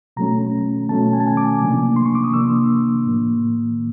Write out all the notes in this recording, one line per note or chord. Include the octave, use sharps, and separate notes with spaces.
B2 F#3 A3 C#4 A#5
B2 F#3 A3 C#4 A5
G#5
A5
G#5
D6
C3 F3 A#3 D4
C6
C#6
D6
D#6
C3 F3 A#3 D4 E6
A2 F3 A#3